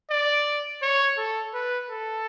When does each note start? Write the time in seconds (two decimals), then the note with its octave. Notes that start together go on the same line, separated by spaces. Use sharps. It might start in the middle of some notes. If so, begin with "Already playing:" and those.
0.10 D5
0.82 C#5
1.18 A4
1.54 B4
1.90 A4